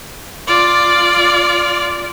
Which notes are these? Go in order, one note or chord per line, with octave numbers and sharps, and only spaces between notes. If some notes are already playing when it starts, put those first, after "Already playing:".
F4 D5